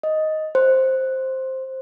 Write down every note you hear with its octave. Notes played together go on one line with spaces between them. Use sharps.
D#5
C5